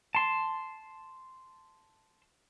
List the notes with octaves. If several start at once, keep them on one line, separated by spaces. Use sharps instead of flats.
A5 C6